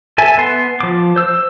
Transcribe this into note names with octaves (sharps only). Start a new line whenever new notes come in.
A4 E5 G#5
B3 C6
F3 D6
C5 E6